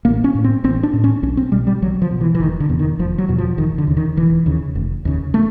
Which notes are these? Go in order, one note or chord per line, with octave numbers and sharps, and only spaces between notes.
A1 A#3
C#4
A2
C4
A1 C4
D4
A2
C#4
B1 C#4
C4
B2 G3
G3
B1 F#3
F3
B2
E3
E3
F1 D#3
D3
E2 B2
D#3
F1 F3
F#3
E2 B2
F3
E1 D#3
D3
D#2 C#3
D#3
E1 E3
D#2 C#3
F1
D#2 C#3
A3